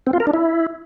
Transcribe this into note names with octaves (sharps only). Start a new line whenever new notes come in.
C4
F4
A#4
D4
E4